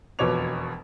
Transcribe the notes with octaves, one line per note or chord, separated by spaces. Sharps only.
E1 F2 B2 C#5 D6 F7